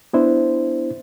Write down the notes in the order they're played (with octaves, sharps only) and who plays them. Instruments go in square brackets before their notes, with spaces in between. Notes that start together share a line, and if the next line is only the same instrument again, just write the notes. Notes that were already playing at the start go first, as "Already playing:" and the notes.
[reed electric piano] B3 D4 E4 C5